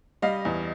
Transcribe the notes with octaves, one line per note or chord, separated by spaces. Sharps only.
G3 D#5 F5
E2